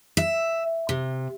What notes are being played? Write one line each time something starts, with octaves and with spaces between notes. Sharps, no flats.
E5
C3